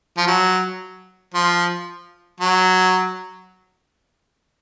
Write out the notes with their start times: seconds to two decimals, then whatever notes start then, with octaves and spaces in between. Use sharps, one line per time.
0.17 F3
0.27 F#3
1.34 F3
2.40 F#3